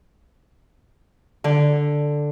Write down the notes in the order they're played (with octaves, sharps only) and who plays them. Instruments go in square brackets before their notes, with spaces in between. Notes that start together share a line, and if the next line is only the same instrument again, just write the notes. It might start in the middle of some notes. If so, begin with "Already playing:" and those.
[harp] D3